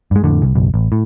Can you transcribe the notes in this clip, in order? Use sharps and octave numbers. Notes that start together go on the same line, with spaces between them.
G2 G#3
F2 A2 D3
C2
F#1 B1
A1
A2